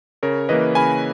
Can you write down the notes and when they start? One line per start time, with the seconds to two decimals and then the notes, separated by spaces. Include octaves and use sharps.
0.23 C#3 A#4 C#5
0.49 E3 A#3 B4 D#5
0.75 C#3 G#5 B5